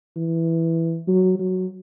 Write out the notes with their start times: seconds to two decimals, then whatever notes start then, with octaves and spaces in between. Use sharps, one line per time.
0.16 E3
1.08 F#3
1.39 F#3